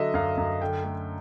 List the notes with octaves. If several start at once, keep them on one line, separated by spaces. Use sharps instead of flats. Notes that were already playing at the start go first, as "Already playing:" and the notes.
Already playing: D3 F#3 D#5 E5
F#2 F5
F#2
D3 G5
A3